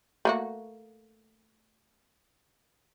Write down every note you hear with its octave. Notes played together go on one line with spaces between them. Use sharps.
A3 A#3 F#4